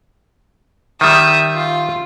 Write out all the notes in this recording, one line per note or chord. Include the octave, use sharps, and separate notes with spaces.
D#3 G3 E5 D#6
F4